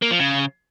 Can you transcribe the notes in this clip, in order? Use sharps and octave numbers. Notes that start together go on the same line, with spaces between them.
A#3
F3
C#3